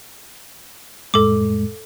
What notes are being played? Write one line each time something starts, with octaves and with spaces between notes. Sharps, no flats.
F2 A2 G#3 A4 D6